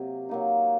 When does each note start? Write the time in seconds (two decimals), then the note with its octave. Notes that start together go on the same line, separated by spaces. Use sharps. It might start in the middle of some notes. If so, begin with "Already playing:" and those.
Already playing: C3 F#3 A#3
0.29 F#3 A#3 D#4